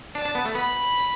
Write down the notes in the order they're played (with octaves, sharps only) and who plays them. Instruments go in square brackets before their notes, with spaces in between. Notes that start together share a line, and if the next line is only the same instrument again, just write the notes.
[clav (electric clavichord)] D4 [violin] A5
[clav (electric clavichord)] D4
B3
A3
[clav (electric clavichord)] B3 [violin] B5